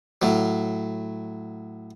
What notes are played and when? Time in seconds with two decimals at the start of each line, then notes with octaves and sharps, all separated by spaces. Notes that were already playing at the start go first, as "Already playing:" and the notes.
0.22 A2 F#3